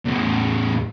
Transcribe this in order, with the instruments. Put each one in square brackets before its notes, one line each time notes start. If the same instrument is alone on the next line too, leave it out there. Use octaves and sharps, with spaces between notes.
[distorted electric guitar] E2 A2